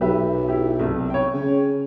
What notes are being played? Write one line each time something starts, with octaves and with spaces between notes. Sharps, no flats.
B1 G4 B4 E5
E4 G4
C2 A3
C#5 G5
C#3